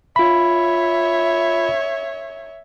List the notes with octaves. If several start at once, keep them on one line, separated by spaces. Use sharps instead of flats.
F4 C#5 E5 B5